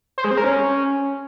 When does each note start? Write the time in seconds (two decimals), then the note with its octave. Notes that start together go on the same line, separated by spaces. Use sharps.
0.18 C5
0.24 G#3
0.31 C4
0.38 A#4
0.44 C#4